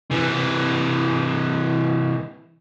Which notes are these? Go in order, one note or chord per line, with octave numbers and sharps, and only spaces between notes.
C3 E3